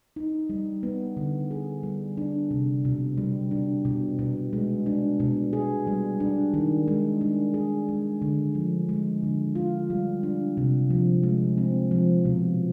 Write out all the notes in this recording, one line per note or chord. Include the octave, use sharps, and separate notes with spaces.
D#4
G3
B3
D3
G#4
G3
D4
C3
B2
G3
D4
B2
B2
G#3
D4
B2
G#4
G3
D4
D#3
G#3
D4
G#4
G#3
D3
F3
G#3
D3
F4
G3
D4
C3
F3
G#3
C4
F3
B2